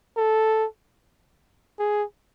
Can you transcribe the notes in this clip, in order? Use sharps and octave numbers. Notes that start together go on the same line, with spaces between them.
A4
G#4